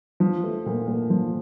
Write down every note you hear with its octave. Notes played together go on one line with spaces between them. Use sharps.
F3
A3
A#2
A#2
F3